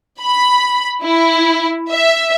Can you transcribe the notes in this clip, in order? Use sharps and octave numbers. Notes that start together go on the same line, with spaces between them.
B5
E4
E5